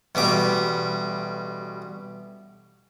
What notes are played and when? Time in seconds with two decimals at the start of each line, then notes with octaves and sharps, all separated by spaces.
0.15 A1 B2 G3 D6